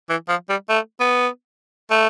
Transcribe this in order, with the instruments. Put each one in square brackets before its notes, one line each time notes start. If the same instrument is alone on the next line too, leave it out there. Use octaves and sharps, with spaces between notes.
[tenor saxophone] E3
F3
G3
A3
B3
A3